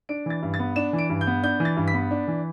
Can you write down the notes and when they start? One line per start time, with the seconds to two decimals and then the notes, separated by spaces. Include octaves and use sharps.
0.09 D4 D7
0.26 E3 A6
0.43 G2
0.54 A6
0.59 B3
0.76 D4 E7
0.93 E3
0.99 D7
1.10 G2
1.21 G6
1.27 B3
1.43 D4 G6
1.60 E3
1.65 A6
1.77 G2
1.88 B6
1.94 B3
2.11 D4
2.28 E3